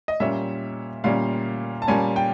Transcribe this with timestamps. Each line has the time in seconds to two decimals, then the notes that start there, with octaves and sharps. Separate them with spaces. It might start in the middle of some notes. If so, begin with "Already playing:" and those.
0.08 D#5
0.20 A#2 G3 A#3 C#4 E5
1.04 A#2 G3 A#3 C#4 F5
1.82 A5
1.88 A#2 G3 A#3 C#4 G#5
2.16 G5